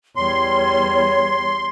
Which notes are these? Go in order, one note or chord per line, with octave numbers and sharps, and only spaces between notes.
E2 G3 C#5 C6